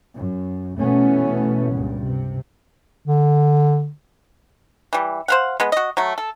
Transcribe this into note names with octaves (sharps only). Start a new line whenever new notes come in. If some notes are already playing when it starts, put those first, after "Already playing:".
F#2
B2 E3 A3 B3 C#4
C#2 G2 A#2
C3
D3
E3 G3
C5 F5 F#5
G#3 B3
F#4 D#5
F#3 A3
A4